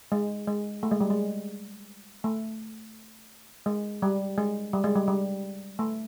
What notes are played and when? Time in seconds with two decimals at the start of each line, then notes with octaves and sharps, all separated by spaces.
0.12 G#3
0.47 G#3
0.83 A3
0.91 G#3
1.00 G3
1.10 G#3
2.24 A3
3.66 G#3
4.02 G3
4.38 G#3
4.73 G3
4.84 G#3
4.96 G3
5.08 G3
5.79 A3